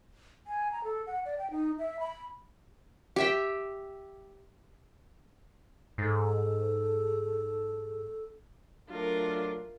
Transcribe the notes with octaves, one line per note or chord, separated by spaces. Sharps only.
G#5
A#5
A4
F#5
D5
G5
D#4
E5
B5
G4 E5 G5
G#2 A4
F#3 A3 D4 F4 A#4